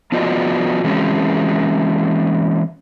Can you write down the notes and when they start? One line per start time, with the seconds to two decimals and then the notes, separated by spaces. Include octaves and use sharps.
0.12 F3 B3 F4 F#4 D5 D#5
0.84 E3 G#3 C4 C#4 F#4